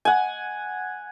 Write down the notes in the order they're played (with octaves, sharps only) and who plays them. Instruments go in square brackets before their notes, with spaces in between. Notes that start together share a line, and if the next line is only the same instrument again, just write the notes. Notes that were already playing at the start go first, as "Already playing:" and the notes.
[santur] F#5 G#5